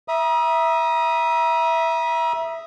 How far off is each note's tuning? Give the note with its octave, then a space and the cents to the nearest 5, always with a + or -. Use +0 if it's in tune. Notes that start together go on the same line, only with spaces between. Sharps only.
E5 +0 A#5 +40 D#6 +0